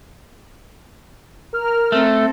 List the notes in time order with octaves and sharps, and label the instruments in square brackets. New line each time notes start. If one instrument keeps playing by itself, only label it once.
[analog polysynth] A#4 F6
[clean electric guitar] A3 [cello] C4 A4